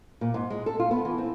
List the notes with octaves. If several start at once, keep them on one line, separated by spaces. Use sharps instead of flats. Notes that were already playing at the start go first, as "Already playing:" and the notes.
A#2
G#2
G#3
A4
F4
B3
E3
C4